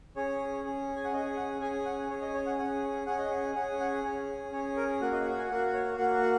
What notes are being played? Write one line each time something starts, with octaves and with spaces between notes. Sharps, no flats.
C#4 G#4 C#5
C#4 G#4
G#5
F#5
C#4 G#4 D#5
F#5
C#4 G#4 G#5
F#5
C#4 G#4 C#5
D#5
C#5
F#5
C#4 G#4 F#5
C#4 G#4 F#5
D#5
F#5
C#4 G#4 F#5
F#5
C#4 G#4 C#5
C#4 G#4 C#5
A#4
A#3 F#4 F#5
D#5
F#5
G#5
A#3 F#4 F#5
C#5
A#3 F#4 F#5
F#5